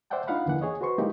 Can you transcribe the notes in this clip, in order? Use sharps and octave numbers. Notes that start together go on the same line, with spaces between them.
C5 D5 E5 F#5 G5 A5
D4 D#4 F4 F5 F#5 B5
E2 D3 E3 A#3 F#5
G#4 C#5 D#5
F#4 B4 C5 C6 C#6
G#3 A#3 D#4 E4 G4